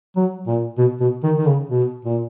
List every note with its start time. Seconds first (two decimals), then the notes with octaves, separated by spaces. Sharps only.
0.16 F#3
0.47 A#2
0.78 B2
1.01 B2
1.24 D#3
1.38 D#3
1.46 C#3
1.70 B2
2.05 A#2